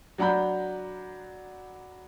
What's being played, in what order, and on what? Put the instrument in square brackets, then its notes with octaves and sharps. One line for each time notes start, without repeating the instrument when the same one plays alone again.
[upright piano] F#3 D4 F#5 A#5 B5 G6